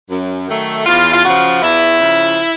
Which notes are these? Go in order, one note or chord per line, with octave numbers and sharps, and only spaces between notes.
F#2
D#3 F#3 A3
E2 F4
F4
C#3 F3 F#4
E2 E4
C#3 F3